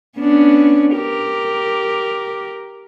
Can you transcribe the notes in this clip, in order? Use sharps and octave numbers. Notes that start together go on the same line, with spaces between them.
B3 C#4 D4
G4 A#4